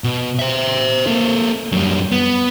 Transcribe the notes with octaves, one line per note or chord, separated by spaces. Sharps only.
B2
C5 E5
A#3 A4
F#2 G3
B3